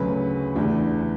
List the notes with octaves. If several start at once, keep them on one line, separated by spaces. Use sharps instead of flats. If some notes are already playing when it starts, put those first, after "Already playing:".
Already playing: D2 C#3 F#3 C#4 B4
E2 D3 A3 D4